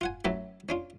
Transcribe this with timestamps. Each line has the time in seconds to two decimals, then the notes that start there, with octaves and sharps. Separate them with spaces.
0.01 F4 F#5 G#5
0.25 F#2 F#3 A3 E4
0.69 C#4 D4 F4